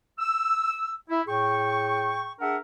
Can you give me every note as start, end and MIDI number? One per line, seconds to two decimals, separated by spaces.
0.19 0.95 88
1.10 1.22 64
1.27 2.33 45
1.27 2.33 68
1.27 2.33 79
1.27 2.33 85
2.41 2.57 62
2.41 2.57 68
2.41 2.57 70
2.41 2.57 76
2.41 2.57 78